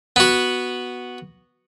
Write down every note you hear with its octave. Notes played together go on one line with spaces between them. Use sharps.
B3 F#4